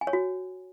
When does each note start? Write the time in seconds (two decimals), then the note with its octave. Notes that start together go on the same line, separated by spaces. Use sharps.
0.01 G#5
0.07 C#5
0.13 F#4